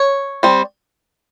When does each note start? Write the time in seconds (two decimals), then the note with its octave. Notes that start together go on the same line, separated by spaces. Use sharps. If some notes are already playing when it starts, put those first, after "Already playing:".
Already playing: C#5
0.43 G3 C4